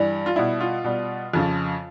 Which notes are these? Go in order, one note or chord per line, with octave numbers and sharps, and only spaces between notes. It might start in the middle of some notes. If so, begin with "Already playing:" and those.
Already playing: G2 E3 G3
F4
B2 G3 E4
F4
B2 G3
F2 C#3 F3